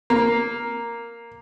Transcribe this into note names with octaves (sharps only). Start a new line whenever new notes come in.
A#3